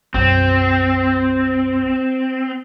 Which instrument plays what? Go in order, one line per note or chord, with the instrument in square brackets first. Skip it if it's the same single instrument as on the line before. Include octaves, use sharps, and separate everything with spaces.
[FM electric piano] B1 F#2 [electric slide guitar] C4